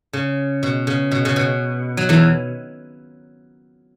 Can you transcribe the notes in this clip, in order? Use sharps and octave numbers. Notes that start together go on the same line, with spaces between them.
C#3
B2
C#3
B2
C#3
B2
F#3
E2 E3